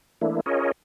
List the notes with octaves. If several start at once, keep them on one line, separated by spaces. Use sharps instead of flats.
E3 A3 A#3 D4 E4
C#4 F4 G#4 A#4 C#5 D#5